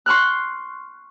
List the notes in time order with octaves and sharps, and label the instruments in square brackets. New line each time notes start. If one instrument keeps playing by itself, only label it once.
[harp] C6 C#6 F6 F#6